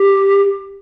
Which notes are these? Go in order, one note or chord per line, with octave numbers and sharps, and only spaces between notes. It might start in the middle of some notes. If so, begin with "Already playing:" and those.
Already playing: G4